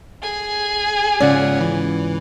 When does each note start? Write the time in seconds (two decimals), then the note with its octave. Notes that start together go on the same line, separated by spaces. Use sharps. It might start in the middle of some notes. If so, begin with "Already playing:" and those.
0.22 G#4 G#5
1.20 G#2 C#3 C#4 F4 D5 F#5
1.60 E3